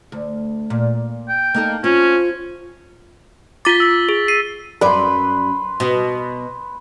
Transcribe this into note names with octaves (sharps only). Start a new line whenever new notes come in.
D2
A#2
G5
A#3 D#4 A4
C4 C#4 F4
F4 D6 A6 B6 G7
E6 B6
G#4
C7 D#7
F#2 B4 D5 C6
B2